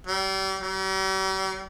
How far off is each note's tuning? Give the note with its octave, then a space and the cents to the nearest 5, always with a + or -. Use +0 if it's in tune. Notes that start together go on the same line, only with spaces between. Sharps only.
G3 -35
G3 -45